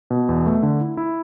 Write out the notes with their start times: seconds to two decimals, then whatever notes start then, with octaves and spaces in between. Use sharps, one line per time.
0.10 B2
0.29 E2
0.46 A3
0.63 D3
0.81 E4
0.97 E4